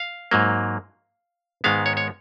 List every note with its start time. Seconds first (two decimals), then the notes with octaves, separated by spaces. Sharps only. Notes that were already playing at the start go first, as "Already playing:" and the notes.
Already playing: F5
0.31 G#2 F#3 A#3
1.64 G#2 D#3 G#3 B3 F5
1.86 C#5
1.97 C#5